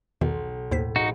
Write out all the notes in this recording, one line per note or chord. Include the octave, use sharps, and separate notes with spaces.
B1 E2 B2 D#3
D#2 A2 C5 B6
A#1 D#4 F#4